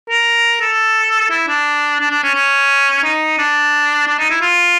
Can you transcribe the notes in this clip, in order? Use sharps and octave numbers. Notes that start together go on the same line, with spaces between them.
A#4
A4
E4
D4
D4
D4
C#4
C#4
D#4
D4
D4
D#4
E4
F4